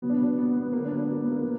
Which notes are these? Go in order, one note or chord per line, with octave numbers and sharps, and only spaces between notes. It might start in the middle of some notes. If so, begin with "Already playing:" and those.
B2 F#3 B3
D4
B3
B3
B3
B3
D3 F#3 A#3
D4
B3
A#3
B3
A#3
A#2 F3